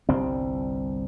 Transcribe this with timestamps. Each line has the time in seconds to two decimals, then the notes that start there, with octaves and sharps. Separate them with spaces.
0.09 G1 C2 G3 C4